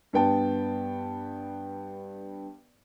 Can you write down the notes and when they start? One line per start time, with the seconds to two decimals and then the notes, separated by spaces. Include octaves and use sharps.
0.13 G2 B3 G5 A5